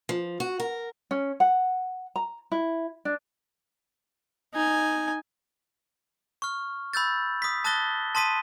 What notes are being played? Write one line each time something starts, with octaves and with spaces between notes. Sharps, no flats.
F3
F#4
A#4
C#4
F#5
A#5
E4
D4
D#4 G#5
C#6 F6
B5 E6 G6 A6
D#6 B6
A5 D#6 F#6 A6 A#6 G7
A5 C6 D#6 B6 D#7